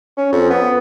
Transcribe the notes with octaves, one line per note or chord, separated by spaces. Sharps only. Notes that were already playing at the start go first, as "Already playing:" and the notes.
C#4
F2
B3